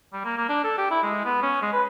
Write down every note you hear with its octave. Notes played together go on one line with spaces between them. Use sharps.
G3
A#3
A#3
D4
A4
G4
E4
G#3
B3
C#4
G#3
B4